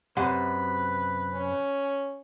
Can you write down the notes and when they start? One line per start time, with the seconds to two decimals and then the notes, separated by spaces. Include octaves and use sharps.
0.17 F#2 C3 B4 F#5
1.33 C#4